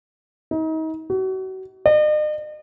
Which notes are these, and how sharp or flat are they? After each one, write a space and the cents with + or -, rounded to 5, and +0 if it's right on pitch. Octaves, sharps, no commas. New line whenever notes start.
D#4 +35
F#4 +35
D#5 -45